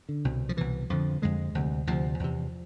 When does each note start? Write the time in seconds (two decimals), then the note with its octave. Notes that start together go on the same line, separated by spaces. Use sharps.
0.09 D3
0.25 C2 B2
0.49 F3
0.57 C2 B2 E3
0.90 F2 D3 F3
1.22 F2 D3 G#3
1.55 D2 C3
1.87 D2 C3 F3
2.20 E2 C3